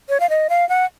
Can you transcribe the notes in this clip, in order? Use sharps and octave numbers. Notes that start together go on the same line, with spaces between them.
C#5
F5
D#5
F5
F#5